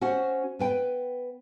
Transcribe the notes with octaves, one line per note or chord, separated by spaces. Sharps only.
C#4 F#4 C5 F#5
B3 B4 G5